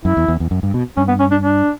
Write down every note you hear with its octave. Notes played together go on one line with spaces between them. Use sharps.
F#2 E4
E2
E2
E2
F#2
G2
B2
G2 C#4
B3
C#4
D4
D4